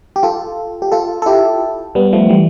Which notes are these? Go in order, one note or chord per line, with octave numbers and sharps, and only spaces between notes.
G4
F4 A4
G4
F4 A4
A4
E4 G4
G3 B3
F3 A3
E3 G3